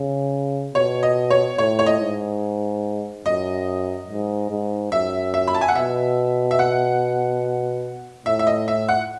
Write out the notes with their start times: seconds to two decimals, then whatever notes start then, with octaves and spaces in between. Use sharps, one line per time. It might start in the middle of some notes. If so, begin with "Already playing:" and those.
Already playing: C#3
0.75 B2 C#5
1.03 D#5
1.30 C#5
1.58 A2 C#5
1.79 C#5
1.86 D#5
2.00 G#2
3.25 F#2 D#5
4.08 G#2
4.51 G#2
4.92 F#2 E5
5.34 E5
5.47 B5
5.54 A5
5.61 G#5
5.68 F#5
5.75 B2 E5
6.51 E5
6.59 F#5
8.26 A2 E5
8.39 E5
8.47 D#5
8.68 E5
8.89 F#5